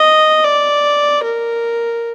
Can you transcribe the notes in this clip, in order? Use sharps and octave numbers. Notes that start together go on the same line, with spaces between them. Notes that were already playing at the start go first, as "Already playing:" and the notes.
Already playing: D#5
D5
A#4